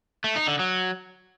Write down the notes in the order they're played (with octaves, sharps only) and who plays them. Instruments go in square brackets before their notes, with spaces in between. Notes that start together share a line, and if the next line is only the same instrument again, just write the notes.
[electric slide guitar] A3
D#4
D3
F#3